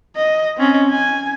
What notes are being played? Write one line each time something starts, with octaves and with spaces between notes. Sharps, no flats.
D#5
C4 C#4
G#5